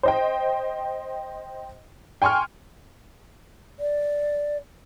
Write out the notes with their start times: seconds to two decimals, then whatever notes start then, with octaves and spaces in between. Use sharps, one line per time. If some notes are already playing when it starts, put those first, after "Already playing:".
0.03 C5 D#5 G5
2.22 G5 G#5 C6 C#6 F6
3.79 D5